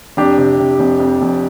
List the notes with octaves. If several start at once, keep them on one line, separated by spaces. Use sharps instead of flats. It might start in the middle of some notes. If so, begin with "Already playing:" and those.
F1 D4 G4
C3
C3
F1
F2
F1